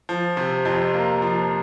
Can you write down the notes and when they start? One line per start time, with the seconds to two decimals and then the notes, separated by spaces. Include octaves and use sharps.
0.09 F3
0.37 C3
0.65 F2
0.94 A#3
1.22 F3